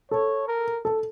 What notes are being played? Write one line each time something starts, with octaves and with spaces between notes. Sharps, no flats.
A4 C#5
A#4
A4